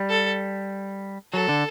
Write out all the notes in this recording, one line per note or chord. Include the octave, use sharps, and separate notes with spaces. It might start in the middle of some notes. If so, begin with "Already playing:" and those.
Already playing: G3
A4
F#3 A4
D3